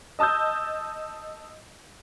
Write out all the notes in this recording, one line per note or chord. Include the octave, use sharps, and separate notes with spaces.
D#5 A5 D#6 E6 G6